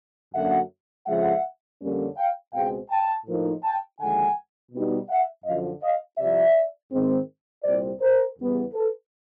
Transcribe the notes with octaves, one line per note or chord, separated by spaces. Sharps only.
F#2 D3 F#3 A#3 D4 E5 F#5
F2 C#3 F3 G#3 E5 F#5
F2 D3 G3 A#3 C#4
F5 G5
C#2 B2 G#3 C4 F5 G5
G5 A5
A2 F3 A#3 D#4
G5 A5
D#2 D3 F3 G#3 F#5 G#5
B2 G3 B3 D#4
E5 F#5
F#2 D3 F3 D#5 F5
D#5 F5
C2 C3 F3 D5 E5
G#2 D#3 G#3 C4
C2 A#2 G3 C4 C5 D5
A#4 C5
E2 C#3 E3 G3 B3
A4 B4